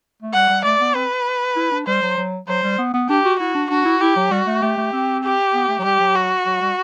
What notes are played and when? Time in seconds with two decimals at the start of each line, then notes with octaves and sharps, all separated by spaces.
0.22 A3
0.34 G3 F#5
0.49 G3
0.65 A3 D5
0.80 B3
0.95 C4 B4
1.56 E4
1.72 D4
1.87 G3 C5
2.03 F#3
2.18 F#3
2.48 F#3 C5
2.63 G3
2.79 B3
2.94 B3
3.09 D4 G4
3.25 F#4
3.40 E4 F#4
3.55 D4
3.71 D4 F#4
3.86 E4
4.01 E4 G4
4.16 F#3
4.31 G3 F#4
4.47 A3
4.62 A3 G4
4.77 A3
4.92 C4
5.24 G4
5.54 B3
5.68 A3
5.79 F#3
5.84 G3 G4
6.00 F#3
6.15 F#4
6.46 F#3
6.61 G3